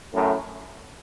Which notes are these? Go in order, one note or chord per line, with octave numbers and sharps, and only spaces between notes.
F#2 A2